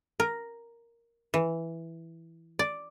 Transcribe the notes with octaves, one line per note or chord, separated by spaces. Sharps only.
A#4
E3
D5